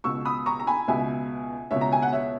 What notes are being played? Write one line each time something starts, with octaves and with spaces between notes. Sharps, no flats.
C#2 B2 C#6 E6
B5 D#6
A#5 C#6
A#5
G#5 B5
C#2 B2 E5 G#5
C#2 B2 C#5 E5
A#5
G#5
F#5
C#5 E5